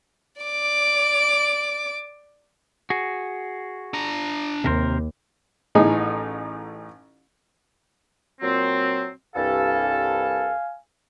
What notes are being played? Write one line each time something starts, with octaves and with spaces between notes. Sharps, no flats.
D5 D6
F#4 G#4
D4 A#5
D#2 C3 A#4 C5
A1 A2 E3 D#4 G#4
A#2 F#3 C4
C2 G2 A4 F5 G#5